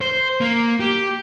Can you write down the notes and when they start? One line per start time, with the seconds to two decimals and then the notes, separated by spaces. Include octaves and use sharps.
0.01 C5
0.41 A#3
0.80 G4